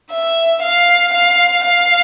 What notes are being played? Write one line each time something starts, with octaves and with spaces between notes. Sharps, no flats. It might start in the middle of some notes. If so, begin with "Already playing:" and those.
E5
F5
F5
F5